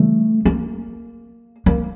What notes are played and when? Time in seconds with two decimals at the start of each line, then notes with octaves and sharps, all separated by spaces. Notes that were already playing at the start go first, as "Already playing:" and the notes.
Already playing: C#3 E3 G3 A3
0.45 A#3
1.66 A#3